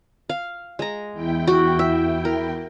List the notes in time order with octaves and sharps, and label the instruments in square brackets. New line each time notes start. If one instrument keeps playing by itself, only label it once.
[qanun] F5
G#3 A#5
[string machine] E2 E4 G5
[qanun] F#4
E5
A#4